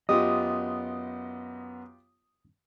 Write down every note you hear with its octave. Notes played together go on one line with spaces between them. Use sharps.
F#2 B3 F4 G4 D#5 D#6